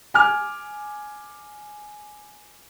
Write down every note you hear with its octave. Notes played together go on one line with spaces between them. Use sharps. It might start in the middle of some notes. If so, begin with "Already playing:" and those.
G#5 D6 F6